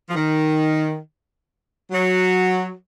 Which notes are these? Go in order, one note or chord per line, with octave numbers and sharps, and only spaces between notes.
F3
D#3
F#3